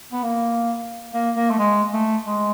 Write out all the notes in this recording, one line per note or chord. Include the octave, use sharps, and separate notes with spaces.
B3
A#3
A#3
A#3
A3
G#3
A3
G#3